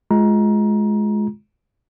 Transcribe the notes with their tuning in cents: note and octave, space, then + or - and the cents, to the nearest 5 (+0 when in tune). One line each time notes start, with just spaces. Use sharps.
G#3 +20 F4 +0 A#5 +20